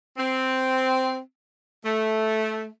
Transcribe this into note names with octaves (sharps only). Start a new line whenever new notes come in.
C4
A3